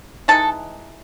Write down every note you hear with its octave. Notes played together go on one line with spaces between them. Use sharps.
E3 G#3 D#4 A4 A5